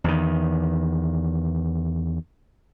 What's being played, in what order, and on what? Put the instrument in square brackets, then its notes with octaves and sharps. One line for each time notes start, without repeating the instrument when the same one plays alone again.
[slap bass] E2 D#3